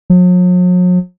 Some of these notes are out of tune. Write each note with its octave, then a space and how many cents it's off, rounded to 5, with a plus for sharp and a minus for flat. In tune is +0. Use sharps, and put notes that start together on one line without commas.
F#3 -45